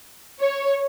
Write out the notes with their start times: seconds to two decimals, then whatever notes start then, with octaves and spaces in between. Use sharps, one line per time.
0.41 C#5